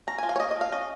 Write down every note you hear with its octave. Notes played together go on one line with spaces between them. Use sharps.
C#4 A#5
F3 G#5
F5
C#5
A#3 D#5
D#5
F3 F5
C#4 D#5